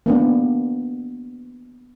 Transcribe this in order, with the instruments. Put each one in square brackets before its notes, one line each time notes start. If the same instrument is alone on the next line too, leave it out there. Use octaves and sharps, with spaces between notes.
[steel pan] A#3 B3 D4